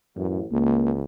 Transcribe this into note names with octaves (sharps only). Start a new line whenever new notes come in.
A1 F#2
C#2 A#3